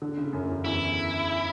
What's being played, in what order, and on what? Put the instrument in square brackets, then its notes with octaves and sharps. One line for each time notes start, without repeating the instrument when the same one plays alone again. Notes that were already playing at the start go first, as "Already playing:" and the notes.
[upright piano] D3
C#3
F#2
E2
[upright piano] E2 [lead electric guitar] E4